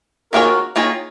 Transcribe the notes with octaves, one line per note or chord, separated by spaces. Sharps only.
D#3 A#3 F4 F#4 G#4 A#4 C#5
D#3 A#3 F4 G#4 C#5